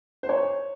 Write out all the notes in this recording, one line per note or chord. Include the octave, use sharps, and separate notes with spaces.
C5
C#5